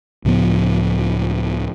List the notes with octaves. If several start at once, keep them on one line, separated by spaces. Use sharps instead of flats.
C#2 A2 F3 B3